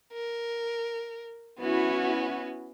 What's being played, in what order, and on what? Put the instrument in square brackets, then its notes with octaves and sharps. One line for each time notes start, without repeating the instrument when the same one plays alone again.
[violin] A#4
[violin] B3 C#4 [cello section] E4 F#4